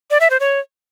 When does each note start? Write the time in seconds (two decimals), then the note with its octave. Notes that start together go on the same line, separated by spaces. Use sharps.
0.11 D5
0.20 E5
0.30 C5
0.40 C#5